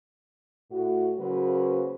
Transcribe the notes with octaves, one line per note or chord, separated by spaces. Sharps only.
A2 F#4
C#3 F#3 A#3 F#4 B4 C5